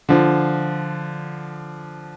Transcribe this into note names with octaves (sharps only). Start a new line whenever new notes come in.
D3 F3